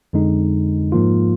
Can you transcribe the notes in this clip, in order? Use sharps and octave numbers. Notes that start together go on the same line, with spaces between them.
F2 D3 G#3 D#4
G#2 F3 A#3 F4